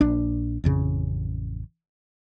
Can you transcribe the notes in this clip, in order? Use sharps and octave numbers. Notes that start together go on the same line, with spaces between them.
A#1 D4
A1 F2 C#3